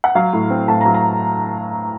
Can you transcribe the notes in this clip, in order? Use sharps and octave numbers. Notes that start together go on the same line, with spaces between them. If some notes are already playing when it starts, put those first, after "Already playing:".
F#5
F#3 F5
A2
C4
A2 A5
F#3 A#5
A#5